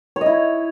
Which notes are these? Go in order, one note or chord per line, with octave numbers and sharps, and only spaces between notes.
C#5
D#5
E4